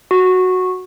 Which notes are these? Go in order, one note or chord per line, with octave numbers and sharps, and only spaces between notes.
F#4